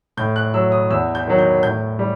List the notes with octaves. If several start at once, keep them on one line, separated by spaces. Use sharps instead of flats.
A2 G6
F#6
F#3 E6
D#6
E2 E6
G6
D#3 F#3
G6
A2 G6
G3